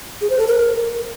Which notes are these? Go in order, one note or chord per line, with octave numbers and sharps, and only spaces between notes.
G#4
C5
A4
A#4